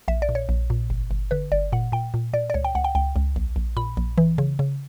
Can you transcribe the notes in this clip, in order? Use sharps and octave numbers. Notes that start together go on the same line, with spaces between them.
A#1 E5
D5
A#2
C#5
A#1
A#2
G1
G1
D3 B4
G1 D5
A#2 F#5
A#2 G5
A#2
A#2 D5
D5
C#2 C#5
G5
C#2 F#5
G5
C#2 G5
C#2
A#1
A#1
A#2 B5
A#1
E3
C#3
C#3